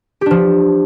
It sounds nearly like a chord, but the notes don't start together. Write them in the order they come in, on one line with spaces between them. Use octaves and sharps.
G4 D4 F3